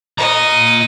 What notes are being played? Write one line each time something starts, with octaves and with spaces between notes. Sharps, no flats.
F4 D#5 A#5